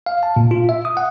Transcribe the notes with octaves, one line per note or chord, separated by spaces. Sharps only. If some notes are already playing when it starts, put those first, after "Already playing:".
F5
A5
A#2
F4
E5
D#6
F#5